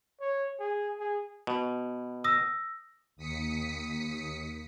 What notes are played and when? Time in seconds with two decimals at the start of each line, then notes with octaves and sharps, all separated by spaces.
0.20 C#5
0.59 G#4
0.98 G#4
1.47 B2
2.24 D#6 E6 A#6
3.17 D#2 D#6 B6 C#7